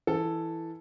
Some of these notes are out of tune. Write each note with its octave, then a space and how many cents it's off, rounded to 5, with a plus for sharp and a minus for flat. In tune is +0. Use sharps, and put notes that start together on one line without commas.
E3 +0 A4 +0